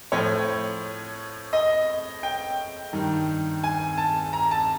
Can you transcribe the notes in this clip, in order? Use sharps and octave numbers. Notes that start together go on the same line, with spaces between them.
A2 F3 C#5
D#5
G5
G2 D#3
G#5
A5
A#5
A5